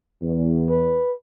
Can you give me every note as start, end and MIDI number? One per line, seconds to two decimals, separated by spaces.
0.22 0.96 40
0.70 1.14 71